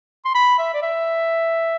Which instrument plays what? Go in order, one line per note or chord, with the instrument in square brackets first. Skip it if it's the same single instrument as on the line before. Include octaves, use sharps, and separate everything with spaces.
[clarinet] C6
B5
E5
D5
E5